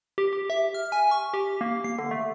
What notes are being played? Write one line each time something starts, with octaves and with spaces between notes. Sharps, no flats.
G4
G4
E5
F6
G#5
C#6
G4
A#3
C7
D3
A3